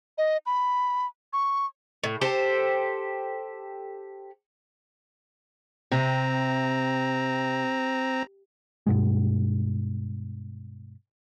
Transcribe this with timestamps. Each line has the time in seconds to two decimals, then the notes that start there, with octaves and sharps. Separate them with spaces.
0.18 D#5
0.46 B5
1.33 C#6
2.04 A2
2.21 G4 A4 C5
5.92 C3 C4 A#5
8.87 G2 B2 G#3